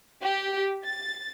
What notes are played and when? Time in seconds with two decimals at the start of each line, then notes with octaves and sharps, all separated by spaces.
0.22 G4
0.84 A6